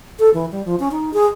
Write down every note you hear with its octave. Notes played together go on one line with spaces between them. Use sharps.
A4
E3
G3
F3
C#4
D#4
G#4